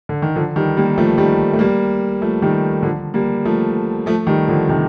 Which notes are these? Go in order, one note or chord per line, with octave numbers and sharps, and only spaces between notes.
D3
D#3
D3 F3
D#3 G3
G3 A#3
F3 A3
D#3 G3
A3
G3 A#3
F3 A3
D#3 G3
D3 F3
G3 A#3
F3 A3
F3 A3
D#3 G3
D3 F3
C3 D#3